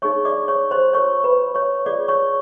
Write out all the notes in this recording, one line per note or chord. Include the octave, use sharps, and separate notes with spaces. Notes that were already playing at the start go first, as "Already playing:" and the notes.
D#4 G#4 C#5 C#6
D5 D6
C#5 C#6
C5 C6
F4 A#4 C#5 C#6
B4 B5
C#5 C#6
F4 G#4 C#5 D5 D6
C#5 C#6